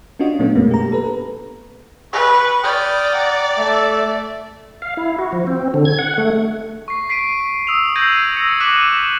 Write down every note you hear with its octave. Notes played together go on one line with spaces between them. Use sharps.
C#4 D4 F4 F#4 D#5
A#2 F#3 A3 B3 C#4 D4
F#2 B2 G#3 A#3 B3
G4 A#5
A4 B4
B4 C#6
D5 G5 D#6 F6
F#5 A#5
A3 A4 E5
F5
E4
F#4
F3
C4
D3
G#6
F#5
A3
C#6 C7
B6 C7 D7 D#7
D#6 E6 F7
G6 G#6 A#6 C7 D#7 F#7
E6 A#6 C#7
D6 F#6 B6 D#7 E7 F#7